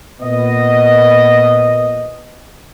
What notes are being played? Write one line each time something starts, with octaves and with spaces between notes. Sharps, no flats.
A#2 B3 D#5